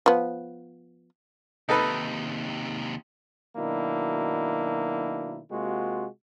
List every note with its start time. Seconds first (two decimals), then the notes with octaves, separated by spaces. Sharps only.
0.06 F3 B3
1.69 D#2 C3 D#4 A4 B4
3.56 B2 D#3 F#3 A#3 D4 E4
5.51 C3 G#3 A#3 F4 F#4